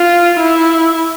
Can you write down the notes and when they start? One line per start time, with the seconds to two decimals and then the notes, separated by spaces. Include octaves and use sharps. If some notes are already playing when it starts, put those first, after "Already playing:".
Already playing: F4
0.40 E4